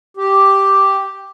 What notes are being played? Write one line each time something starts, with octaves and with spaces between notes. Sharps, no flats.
G4